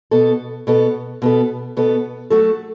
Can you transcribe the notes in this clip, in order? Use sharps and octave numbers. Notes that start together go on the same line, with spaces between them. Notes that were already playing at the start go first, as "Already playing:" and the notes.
B2 B3 A4
B2 B3 A4
B2 B3 A4
B2 B3 A4
F#3 A3 F#4 A4